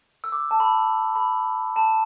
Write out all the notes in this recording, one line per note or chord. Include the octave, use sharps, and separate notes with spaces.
E6
D6
A5
B5
B5
A5